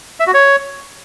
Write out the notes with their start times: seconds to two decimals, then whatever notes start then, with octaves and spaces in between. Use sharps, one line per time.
0.20 E5
0.27 F#4
0.34 C#5